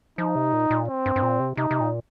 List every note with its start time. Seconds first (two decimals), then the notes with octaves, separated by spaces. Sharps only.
0.18 F3 D#4
0.36 C3
0.53 A#2
0.70 A#2
0.88 C4
1.06 G2
1.16 G2
1.23 A#2
1.40 C3
1.57 C3 D#4
1.71 C3
1.80 A#2